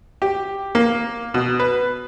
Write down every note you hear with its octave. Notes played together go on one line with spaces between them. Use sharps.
G4
A#3
B2
B4